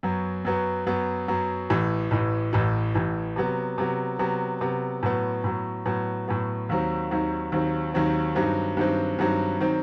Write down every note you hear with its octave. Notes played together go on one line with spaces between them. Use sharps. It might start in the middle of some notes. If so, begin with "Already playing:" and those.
F#2 F#3 B3
F#2 F#3 B3
F#2 F#3 B3
F#2 F#3 B3
A1 A2 E3
A1 A2 E3
A1 A2 E3
A1 A2 E3
C3 F#3 B3
C3 F#3 B3
C3 F#3 B3
C3 F#3 B3
A2 F#3 B3
A2 F#3 B3
A2 F#3 B3
A2 F#3 B3
D#2 D#3 F#3 C4
D#2 D#3 F#3 C4
D#2 D#3 F#3 C4
D#2 D#3 F#3 C4
G2 D#3 F#3 C4
G2 D#3 F#3 C4
G2 D#3 F#3 C4
D#3 F#3 C4